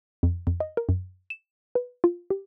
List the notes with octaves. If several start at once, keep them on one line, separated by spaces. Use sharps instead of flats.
F2
F2
D#5
A#4
F#2
E7
B4
F4
G4